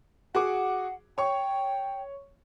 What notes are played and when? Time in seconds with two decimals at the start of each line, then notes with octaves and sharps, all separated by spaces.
0.35 F#4 G#4 F#5 D6
1.18 C#5 G5 C#6